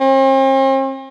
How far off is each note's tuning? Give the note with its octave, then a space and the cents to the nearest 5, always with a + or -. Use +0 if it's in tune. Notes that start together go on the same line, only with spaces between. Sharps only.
C4 +45